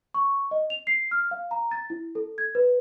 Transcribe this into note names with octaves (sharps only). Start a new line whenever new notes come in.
C#6
D#5
F7
C7
F6
F5
A#5
A6
E4
A4
G#6
B4